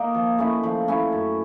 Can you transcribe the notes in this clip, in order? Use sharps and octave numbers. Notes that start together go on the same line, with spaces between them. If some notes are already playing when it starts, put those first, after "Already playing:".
Already playing: A#3 D#4
F3
A3 C#4 E4
F3
A3 C#4 E4
F#2